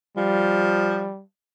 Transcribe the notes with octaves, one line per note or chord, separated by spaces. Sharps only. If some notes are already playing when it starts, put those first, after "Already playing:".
F3 G3